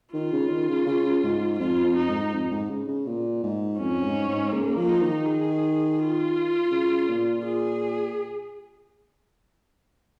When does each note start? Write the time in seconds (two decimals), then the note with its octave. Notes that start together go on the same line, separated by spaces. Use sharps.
0.14 D#3 F4
0.32 C#3
0.50 D#3
0.68 C#3
0.87 C#3
1.23 G#2
1.60 F2 F4
1.84 F2
1.97 D#4
2.09 G#2
2.34 F2
2.51 G#2
2.70 C#3
2.88 C#3
3.06 A#2
3.43 G#2
3.79 F2 C#4
4.03 G#2
4.28 G#2
4.52 C#3 A#3
4.77 F3
4.89 D#4
5.01 D#3
5.26 G#4
5.98 F4
6.71 C#3
7.09 A#2
7.45 G#4